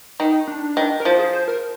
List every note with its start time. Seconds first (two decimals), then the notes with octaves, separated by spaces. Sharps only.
0.20 D#3 D#4
0.47 D4
0.77 D#3
1.00 A#4
1.05 F3 C5
1.19 G#4
1.33 C5
1.48 A#4